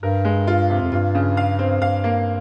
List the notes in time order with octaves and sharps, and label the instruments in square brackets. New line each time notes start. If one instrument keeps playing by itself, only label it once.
[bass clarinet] G2 [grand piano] A#4
[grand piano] G#3
F4
C3
[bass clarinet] F2
[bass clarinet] G2 [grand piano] F4
[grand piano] C#3
F5
C4
[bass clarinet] G2 [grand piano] F5
[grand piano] A#3